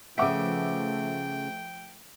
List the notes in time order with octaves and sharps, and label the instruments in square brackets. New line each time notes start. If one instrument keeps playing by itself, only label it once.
[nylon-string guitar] C#3 B3 [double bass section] F3 A3 [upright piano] E5 F#5 D6 [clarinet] G5